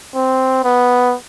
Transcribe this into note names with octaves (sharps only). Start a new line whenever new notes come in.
C4
B3